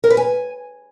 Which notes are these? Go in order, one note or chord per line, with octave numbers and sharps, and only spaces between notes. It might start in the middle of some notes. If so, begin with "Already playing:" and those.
A#4
B4
G#5